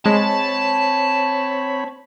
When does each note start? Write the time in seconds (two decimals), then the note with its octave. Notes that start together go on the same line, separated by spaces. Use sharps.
0.06 G#3 C4 C#5 A5 B5